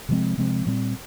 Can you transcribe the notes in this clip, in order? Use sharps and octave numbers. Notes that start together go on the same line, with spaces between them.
C3 F3 G#3 C4
C3 F3 G#3 C4
A#2 G3 C4